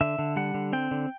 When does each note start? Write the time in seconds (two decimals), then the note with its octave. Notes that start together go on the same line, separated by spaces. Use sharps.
0.01 D3 E5
0.19 D3
0.36 G3 F#5
0.54 D3
0.73 C4 G5
0.91 D3